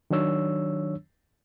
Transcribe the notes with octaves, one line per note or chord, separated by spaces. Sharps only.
D#3 F#3 D4 C#5 E6